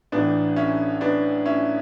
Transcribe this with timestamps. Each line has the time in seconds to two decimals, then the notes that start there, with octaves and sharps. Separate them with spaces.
0.12 A1 A2 E3 B3 D4
0.56 C#4 E4
1.01 B3 D4
1.45 C#4 E4